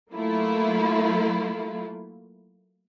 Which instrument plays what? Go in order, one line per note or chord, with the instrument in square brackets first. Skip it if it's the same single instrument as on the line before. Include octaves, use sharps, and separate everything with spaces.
[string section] F#3 A3 A#3 E4 F4